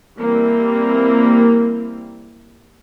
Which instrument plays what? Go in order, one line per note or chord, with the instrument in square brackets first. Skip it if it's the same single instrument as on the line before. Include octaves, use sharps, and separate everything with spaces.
[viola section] E3 G3 A#3 C4